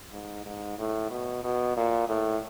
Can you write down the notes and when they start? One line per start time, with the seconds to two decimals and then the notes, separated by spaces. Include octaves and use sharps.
0.12 G#2
0.45 G#2
0.78 A2
1.11 B2
1.44 B2
1.76 A#2
2.08 A2